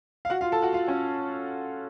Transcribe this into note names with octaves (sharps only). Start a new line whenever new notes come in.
F5
F#4 F#5
F4 F5
A4 A5
F#4 F#5
F4 F5
C#4 C#5